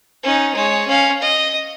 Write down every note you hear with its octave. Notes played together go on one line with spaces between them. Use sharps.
C#4 D#4
G#3 C#5
C#4 F5
D#5